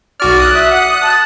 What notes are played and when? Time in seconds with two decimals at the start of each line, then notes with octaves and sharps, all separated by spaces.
0.20 B1 F#4 D5 F6
0.39 D#6 F#6
0.55 E5
0.70 F#5
1.02 A5